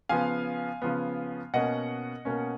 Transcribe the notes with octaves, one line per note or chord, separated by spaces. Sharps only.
C#3 F3 B3 F5 G#5
C#3 F3 B3
B2 A#3 C#4 D#5 F#5
B2 A#3 C#4